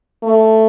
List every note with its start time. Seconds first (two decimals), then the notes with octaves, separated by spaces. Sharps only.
0.23 A3